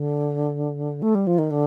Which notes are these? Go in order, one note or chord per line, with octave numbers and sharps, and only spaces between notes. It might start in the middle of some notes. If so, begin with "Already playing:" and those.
Already playing: D3
A3
G3
F3
D#3
D3